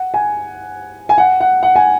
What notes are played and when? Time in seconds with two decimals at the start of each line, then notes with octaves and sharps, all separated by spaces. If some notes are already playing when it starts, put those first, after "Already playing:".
Already playing: F#5
0.14 G#5
1.09 G#5
1.18 F#5
1.41 F#5
1.63 F#5
1.76 G#5